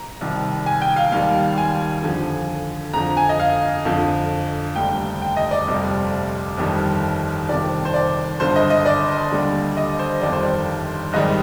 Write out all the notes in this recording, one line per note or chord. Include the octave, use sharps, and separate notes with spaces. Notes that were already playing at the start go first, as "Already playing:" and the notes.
Already playing: A#5
C2 C3 D#3 G3
G#5
G5
F5
D#2 D#3 G3 F5
G#5
F2 D3 F3
F2 D3 F3 A#5
G#5
D#5
F5
F2 D3 F3
F1 D#2 D3 G3 G5
G5
D#5
D5
G1 F2 C3 G3
G1 F2 D#3 G3
G1 F2 C3 D#3 D5
C5
D5
G1 G2 D3 C5
D#5
D#5
D5
D#2 D3 G3
D#5
C5
G1 F2 D#3 G3 D5
C5
D5
G#1 G#2 D#3 G3 D#5